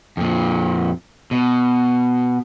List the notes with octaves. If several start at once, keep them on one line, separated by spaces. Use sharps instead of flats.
F2 A#2
B2